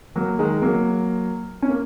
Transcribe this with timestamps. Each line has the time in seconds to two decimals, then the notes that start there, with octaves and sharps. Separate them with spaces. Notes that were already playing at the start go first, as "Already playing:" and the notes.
0.15 F#3 A#3
0.39 D#3 G#3
0.62 F#3 A#3
1.62 C#4
1.69 A#3